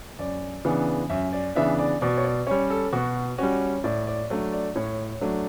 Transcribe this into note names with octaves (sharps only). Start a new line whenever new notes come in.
F#2 D5
C#3 E3 B3 D4
F#2 E5
D5
C#3 E3 B3 D4 E5
D5
B2 D5
C#5
D5
G3 C#4 C#5
A4
B2 F#4
G3 C#4 F#4
A2 D5
D5
F#3 A3 D4
D5
A2 C#5
F#3 A3 D4